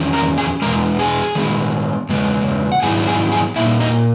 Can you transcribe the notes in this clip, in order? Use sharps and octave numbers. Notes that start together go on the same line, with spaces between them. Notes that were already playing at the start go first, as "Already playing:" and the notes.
Already playing: E2 D#3 C#4
A#4 A#5
G#4 G#5
E2 B2 G#3 A#4 A#5
G#4 G#5
D#3 G#3 B3
E2 C#3 G#3 B3
F#5
G#2 D#3 F#3 B3 E4 G#4 G#5
G#4 G#5
G#4 G#5
A#2 A#3 D#4 E4 E5
D#4 D#5